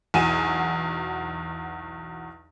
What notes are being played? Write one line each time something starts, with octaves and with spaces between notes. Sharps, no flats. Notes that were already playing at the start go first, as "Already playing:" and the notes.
B1 E2 F#4 G#5 D#7 E7